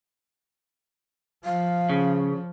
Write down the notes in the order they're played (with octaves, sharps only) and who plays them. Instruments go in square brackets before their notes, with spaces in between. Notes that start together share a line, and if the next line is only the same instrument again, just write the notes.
[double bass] F3 [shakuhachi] F5
[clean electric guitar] C#3